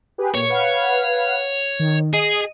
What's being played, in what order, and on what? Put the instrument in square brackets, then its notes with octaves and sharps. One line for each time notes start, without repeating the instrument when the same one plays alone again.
[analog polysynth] G4 G#4 B4
[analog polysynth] A#2 [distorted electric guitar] C#5
[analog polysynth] B4 F5 F#5
D#3
[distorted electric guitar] G#4 [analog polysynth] D#5 D#7